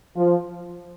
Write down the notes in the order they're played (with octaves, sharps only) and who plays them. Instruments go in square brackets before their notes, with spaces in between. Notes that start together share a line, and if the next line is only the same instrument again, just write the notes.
[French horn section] F3